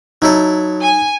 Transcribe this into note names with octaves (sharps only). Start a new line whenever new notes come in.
F#3 D#4 E4 A4
G#5